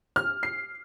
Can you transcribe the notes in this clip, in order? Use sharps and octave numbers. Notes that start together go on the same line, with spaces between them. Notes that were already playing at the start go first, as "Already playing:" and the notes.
F6
C7